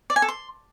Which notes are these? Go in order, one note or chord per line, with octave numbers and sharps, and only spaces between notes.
D5
G#5
A4
C6